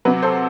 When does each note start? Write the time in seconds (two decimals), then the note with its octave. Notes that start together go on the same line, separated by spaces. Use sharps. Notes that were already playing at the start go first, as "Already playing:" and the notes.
0.05 C3 F#3 B4
0.22 A4 C5